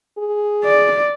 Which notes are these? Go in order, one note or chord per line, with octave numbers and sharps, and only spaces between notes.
G#4
D5